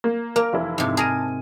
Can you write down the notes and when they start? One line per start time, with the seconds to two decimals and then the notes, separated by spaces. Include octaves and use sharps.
0.04 A#3
0.36 A#3 A#4
0.53 F1 E3 E4
0.78 G#2 C3
0.97 G#4 A#4 A5 D#7